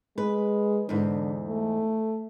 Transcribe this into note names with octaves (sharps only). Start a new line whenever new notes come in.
G#3 B4
E2 G#2 D3
A3